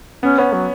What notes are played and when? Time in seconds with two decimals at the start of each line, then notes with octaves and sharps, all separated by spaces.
0.23 B3 C#4
0.38 B3 C#4
0.53 F#3